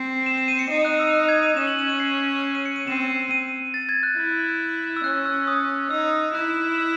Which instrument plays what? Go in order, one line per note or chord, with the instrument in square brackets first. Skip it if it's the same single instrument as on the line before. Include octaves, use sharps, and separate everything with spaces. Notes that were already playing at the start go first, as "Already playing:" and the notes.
Already playing: [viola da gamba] C4
[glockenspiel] E7
E7
D#7
C#7
[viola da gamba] D#4 [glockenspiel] D#7
[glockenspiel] F#6
E6
F#6
G#6
D#7
[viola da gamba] C#4 [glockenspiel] E7
[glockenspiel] F#7
E7
D#7
C7
C7
D#7
C#7
D#7
[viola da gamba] C4 [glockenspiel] E7
[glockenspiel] D#7
A6
G#6
F#6
[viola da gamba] E4
[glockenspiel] E6
[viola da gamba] C#4 [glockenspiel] F#6
[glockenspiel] E6
D#6
[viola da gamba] D#4 [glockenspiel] E6
[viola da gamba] E4 [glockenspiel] F#6
[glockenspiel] E6